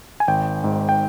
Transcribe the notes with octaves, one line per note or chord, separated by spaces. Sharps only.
G#5
G#1 G5
G#2
G5